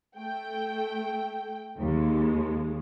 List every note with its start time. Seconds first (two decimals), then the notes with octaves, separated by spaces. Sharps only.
0.16 A3 G5
1.80 D#2 G#3